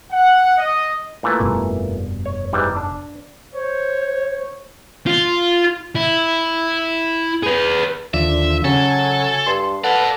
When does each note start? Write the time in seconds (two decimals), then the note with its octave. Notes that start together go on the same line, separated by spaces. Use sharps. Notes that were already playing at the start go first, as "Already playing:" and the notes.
0.12 F#5
0.58 D#5
1.23 A#2 E3 A3
1.40 F1 G2 B2
2.25 C#5
2.53 G#2 E3 G3
2.76 D4
3.54 C5 C#5
5.07 F4
5.96 E4
7.43 G#4 B4
8.14 D#2 D3 F3 D5 E5
8.65 C#3 F#3 A4 G#5
9.46 G2 C6
9.84 A4 B4 D5 F5 F#5